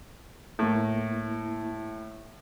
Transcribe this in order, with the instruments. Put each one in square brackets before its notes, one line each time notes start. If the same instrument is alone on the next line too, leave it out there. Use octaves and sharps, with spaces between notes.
[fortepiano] A2 [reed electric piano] A#3 E4